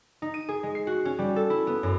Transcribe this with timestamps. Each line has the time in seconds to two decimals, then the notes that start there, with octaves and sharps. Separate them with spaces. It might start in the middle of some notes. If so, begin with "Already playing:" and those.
0.22 D#4
0.34 D#7
0.49 G#4
0.63 G#3
0.75 C7
0.87 F#4
1.05 C#4
1.19 G3
1.36 A4
1.50 E4
1.67 B3
1.83 F#2